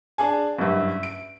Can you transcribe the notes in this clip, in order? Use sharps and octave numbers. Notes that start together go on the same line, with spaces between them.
D4 G#4 G#5
F#1 G2 E5
D7